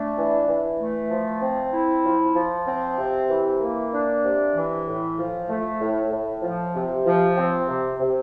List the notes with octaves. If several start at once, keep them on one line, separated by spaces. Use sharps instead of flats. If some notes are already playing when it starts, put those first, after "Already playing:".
Already playing: A3 D4
E3
E3
A3
F3
C4
E4
F3
F3
C4
C3
E3
A#3
D4
C3
E3
A2
F3
A3
A2
A2
F3
C3
F3
C4
C3
C3